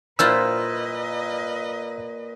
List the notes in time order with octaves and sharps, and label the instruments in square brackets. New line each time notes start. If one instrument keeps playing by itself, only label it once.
[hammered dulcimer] A#2 [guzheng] E4 F4 C5 [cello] B4 D#5 [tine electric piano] E6